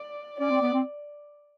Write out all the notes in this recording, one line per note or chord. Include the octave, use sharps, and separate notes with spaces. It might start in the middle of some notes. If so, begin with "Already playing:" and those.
Already playing: D5
C#4 D5
C4
B3
C4